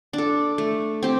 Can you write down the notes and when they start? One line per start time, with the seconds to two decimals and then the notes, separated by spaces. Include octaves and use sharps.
0.13 D4 A4
0.58 A3
1.03 C4 G4